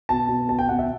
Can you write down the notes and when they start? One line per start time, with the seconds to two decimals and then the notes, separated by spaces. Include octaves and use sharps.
0.09 B2 A5
0.29 B2
0.49 B2 A5
0.59 G5
0.69 B2 F#5
0.79 E5